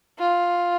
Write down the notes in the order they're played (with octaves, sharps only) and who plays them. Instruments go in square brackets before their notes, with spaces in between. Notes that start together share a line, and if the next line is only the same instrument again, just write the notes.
[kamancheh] F4